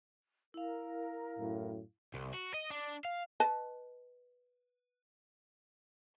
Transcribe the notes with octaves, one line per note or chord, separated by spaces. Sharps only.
E4 A#4 F5
F#2 A2
C2
F#4
D#5
D4
F5
B4 D#5 A5